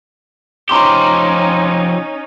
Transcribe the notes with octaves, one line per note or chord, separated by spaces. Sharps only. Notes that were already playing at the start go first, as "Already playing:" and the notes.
F3 C#4 D#4 G4 A#5 C6 D6